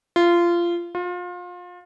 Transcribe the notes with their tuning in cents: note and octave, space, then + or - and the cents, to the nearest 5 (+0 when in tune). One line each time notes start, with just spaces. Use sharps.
F4 -20
F4 +30